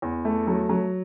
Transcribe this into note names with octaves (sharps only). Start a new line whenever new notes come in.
E2
A3
F#3
F#3